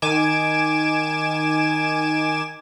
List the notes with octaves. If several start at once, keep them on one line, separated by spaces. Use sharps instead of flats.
D#3 G#5 D6 E7